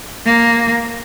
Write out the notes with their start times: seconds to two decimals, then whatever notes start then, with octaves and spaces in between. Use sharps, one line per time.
0.25 A#3